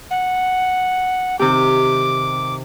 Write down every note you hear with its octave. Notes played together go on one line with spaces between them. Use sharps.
F#5
C3 D#3 G4 D6